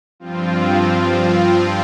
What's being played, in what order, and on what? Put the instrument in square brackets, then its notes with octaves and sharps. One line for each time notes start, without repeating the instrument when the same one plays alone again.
[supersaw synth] G2 F3 C4 F4